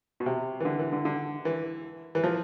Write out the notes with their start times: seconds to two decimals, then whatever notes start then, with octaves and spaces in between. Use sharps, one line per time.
0.20 B2
0.26 C3
0.60 E3
0.65 D3
0.79 E3
0.92 D3
1.05 D3
1.45 E3
2.15 E3
2.24 F3